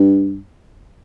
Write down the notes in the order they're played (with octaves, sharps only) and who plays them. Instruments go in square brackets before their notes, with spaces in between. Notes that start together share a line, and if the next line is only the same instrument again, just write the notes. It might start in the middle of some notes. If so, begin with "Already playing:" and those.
Already playing: [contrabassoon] G2